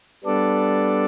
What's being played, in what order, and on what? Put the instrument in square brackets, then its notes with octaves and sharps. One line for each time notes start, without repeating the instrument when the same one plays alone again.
[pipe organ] G3 B3 D4 A4 D5